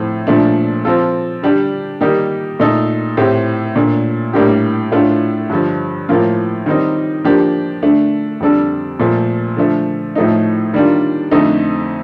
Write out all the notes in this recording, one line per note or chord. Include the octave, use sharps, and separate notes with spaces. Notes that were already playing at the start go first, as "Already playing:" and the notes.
Already playing: A2 F3 C4 F4 A4
A#2 F3 A3 D4
F3 C4 F4 A4
D3 G3 D4 G4
D#3 G3 A#3 D#4 G4
A#2 A3 D#4 A4
A2 A3 C4 G4
A#2 A3 D4
A2 G3 A#3 D4 G4
A2 A3 D4 F4
G2 D3 F3
A2 F3 A#3 F4
D#3 G3 C4 D#4
F3 A#3 D4 G4
D3 A3 D4
F2 D3 G3 D4 A4
A#2 F3 A3
D3 F3 A3
A2 F3 A3 D#4
D#3 G3 A#3 D4 F4
F2 D3 A3 D#4